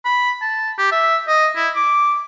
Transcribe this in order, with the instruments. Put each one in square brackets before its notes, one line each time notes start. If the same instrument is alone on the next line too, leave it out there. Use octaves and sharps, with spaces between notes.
[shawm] B5
A5
G4
E5
D#5
E4
D6